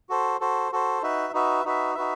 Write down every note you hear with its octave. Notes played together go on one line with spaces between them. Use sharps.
F#4 A4 C5
F#4 A4 C5
F#4 A4 C5
D#4 F#4 B4 E5
D#4 F#4 B4 E5
D#4 F#4 B4 E5
D#4 F#4 B4 E5